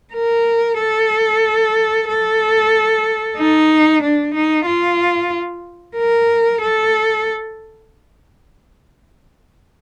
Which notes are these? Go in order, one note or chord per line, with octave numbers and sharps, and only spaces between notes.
A#4
A4
A4
D#4
D4
D#4
F4
A#4
A4